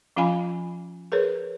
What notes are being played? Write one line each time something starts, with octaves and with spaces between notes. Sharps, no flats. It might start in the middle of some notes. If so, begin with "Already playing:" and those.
F3 C#4 F4 F5 G#5 B5
G#4 A#4 B4 C#5